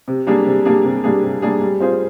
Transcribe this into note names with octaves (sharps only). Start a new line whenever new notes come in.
C3
G3 A#3 D4 G#4
C3
G3 A#3 D4 G#4
C3
G3 A#3 D4 G#4
C3
G3 A#3 D4 G#4
G3
C4 F4 G#4 C5